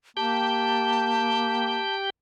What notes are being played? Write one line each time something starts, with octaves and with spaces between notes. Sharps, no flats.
A#3 G4 G5 A5 G6